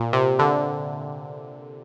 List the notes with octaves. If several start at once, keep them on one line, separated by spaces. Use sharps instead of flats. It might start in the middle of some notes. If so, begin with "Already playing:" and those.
Already playing: A#2
C3
D3